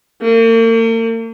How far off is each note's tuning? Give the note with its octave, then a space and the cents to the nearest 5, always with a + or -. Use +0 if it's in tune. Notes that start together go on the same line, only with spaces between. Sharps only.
A#3 -45